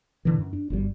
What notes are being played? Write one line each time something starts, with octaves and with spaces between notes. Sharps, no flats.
A#2 D3 E3
F#2
D4
G1 F#2 C#3 G3